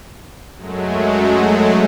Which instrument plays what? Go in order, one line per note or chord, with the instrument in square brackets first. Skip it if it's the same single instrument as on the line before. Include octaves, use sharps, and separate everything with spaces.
[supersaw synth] F#2 F#3 G#3 A3